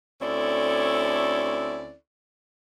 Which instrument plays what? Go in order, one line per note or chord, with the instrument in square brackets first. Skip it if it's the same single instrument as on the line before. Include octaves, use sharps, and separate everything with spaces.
[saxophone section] D2 C4 C#4 E4 A4 D5